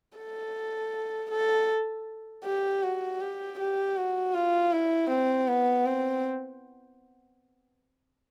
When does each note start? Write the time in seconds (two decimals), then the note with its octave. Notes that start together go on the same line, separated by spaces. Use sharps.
0.17 A4
1.31 A4
2.44 G4
2.83 F#4
3.20 G4
3.59 G4
3.97 F#4
4.34 F4
4.73 E4
5.10 C4
5.48 B3
5.85 C4